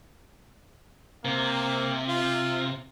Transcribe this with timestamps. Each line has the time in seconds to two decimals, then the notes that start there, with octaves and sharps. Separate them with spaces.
1.25 C3 A#3
2.09 F4